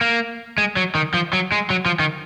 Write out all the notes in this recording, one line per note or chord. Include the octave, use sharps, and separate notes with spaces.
A#3
G#3
F#3
D#3
F3
F#3
G#3
F#3
F3
D#3